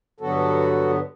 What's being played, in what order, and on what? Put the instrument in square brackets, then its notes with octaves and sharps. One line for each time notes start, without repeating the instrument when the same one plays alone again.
[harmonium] G2 D3 F#3 B3 F#4 A4